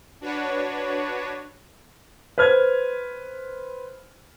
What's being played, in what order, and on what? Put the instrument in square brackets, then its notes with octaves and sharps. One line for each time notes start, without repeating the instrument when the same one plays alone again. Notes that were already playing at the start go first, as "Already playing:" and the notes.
[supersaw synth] D4 F#4 B4 C#5
[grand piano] B4 C5 F6 G#6